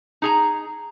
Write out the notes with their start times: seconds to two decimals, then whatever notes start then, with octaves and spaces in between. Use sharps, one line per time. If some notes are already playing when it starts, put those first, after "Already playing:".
0.22 D#4 G#4 A#5